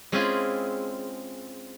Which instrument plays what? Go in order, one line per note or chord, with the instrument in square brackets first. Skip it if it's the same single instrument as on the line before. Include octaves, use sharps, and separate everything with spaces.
[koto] G#3 C4 C#4 E4 F4 G#4